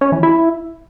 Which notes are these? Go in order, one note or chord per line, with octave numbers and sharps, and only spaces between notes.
C#4
E3
E4